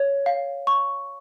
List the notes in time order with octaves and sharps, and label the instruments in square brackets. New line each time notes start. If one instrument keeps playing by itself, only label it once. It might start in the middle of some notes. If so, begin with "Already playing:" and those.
Already playing: [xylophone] C#5
F5
C#6